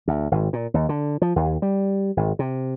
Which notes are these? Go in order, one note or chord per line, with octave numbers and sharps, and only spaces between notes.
D2
G#1
A#2
D#2
D3
F3
D#2
G3
G#1
C3